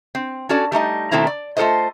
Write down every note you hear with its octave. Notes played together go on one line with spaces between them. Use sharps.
C4
C#4 F#4 A4 D5
G3 A3 D#4 D#5
B2 D#3 A3 C4 E4 A#5
D5
A3 F4 A4 A#4 C5 D#5